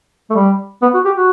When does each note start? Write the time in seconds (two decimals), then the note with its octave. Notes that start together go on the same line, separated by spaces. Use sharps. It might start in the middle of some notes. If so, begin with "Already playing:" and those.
0.30 A3
0.35 G3
0.82 B3
0.94 F#4
1.05 G4
1.17 F#4